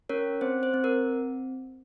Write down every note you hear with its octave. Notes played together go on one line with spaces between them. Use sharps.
C#4 A#4 C#5
C4 C5
C5
C4
A#4